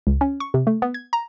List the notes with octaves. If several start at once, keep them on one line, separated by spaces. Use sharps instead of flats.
C#2
C#4
C#6
C3
A3
B3
G#6
A#5